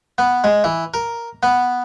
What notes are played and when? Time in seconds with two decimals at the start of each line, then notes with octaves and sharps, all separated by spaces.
0.18 B3
0.44 G#3
0.64 E3
0.94 A#4
1.43 B3